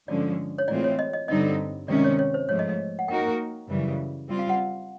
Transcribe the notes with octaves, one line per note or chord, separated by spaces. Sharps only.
G2 D3 F3 G#3 C#4 D5
C#5
A2 E3 G#3 C4 F4 D5
C#5
D#5
D#5
G2 D3 G3 C4 D#4 D#5
C3 D#3 G#3 C#4 D5
D5
C#5
C#5
C5
G#2 F3 A3 C#5
D#5
D#5
F#5
A#3 D#4 F#4 A#4 G5
F#2 C#3 E3 G3
G3 C4 F4
F5
F#5